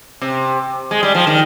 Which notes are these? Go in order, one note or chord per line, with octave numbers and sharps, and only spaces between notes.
C3
G#3
G3
F3
D#3